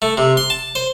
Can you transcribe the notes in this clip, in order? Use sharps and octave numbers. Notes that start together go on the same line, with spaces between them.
A3
C3
C6
A5
C5